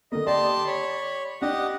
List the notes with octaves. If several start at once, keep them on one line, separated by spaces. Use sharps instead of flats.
D3 A#3 D#5
G4 D5 A5 C6
C#5 B5
D4 G4 D#5 F#5